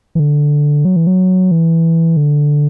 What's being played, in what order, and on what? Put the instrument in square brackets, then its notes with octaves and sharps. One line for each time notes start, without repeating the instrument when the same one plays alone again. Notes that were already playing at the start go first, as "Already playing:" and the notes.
[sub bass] E3
D3
F#3
E3
F#3
E3
D3